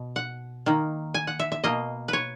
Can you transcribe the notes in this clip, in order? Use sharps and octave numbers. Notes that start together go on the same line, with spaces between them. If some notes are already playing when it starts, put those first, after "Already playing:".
Already playing: B2
F#5
D#3 A#3
G#5
F#5
E5
E5
B2 A#3 D#5
B4 C#5